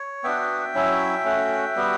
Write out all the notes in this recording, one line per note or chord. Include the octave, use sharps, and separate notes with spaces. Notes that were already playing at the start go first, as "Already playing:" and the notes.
Already playing: C#5
B3 D4 F#4 E5 G5
F#3 C#4 E4
A3 C#4 F#4
G3 B3 F#4